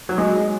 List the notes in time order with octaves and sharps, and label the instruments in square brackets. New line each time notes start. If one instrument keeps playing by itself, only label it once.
[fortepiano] F#3
G#3